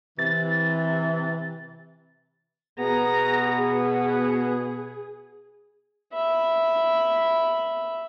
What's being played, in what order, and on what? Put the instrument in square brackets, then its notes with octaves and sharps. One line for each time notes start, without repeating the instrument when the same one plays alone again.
[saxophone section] C3 E3 [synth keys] A6
[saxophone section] B2 B3 [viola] G#4 A#5
[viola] G#4
[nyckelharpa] E5 B5